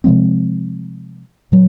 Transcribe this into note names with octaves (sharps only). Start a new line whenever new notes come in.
C3 F3 G#3 C4
A#2 F#3